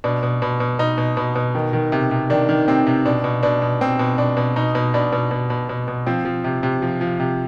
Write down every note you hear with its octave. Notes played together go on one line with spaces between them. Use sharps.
B2 D4
B2
B2
B2
B2 D#4
B2
B2
B2
D#3
D#3
C3
C3
D#3 D4
D#3
C3 C4
C3
B2 D4
B2
B2 D4
B2
B2 C4
B2
B2 D4
B2
B2 D#4
B2
B2 D4
B2
B2
B2
B2
B2
F3 C4
F3
C3
C3
F3
F3
C3